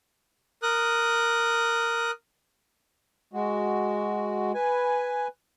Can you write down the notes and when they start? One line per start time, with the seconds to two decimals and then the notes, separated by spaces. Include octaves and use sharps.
0.63 A#4 D#6 F#6
3.33 G#3 F#4
4.54 B4 G#5